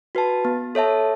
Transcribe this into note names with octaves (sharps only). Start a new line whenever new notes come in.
F#4 B4 A5
B3
A4 C#5 E5 A5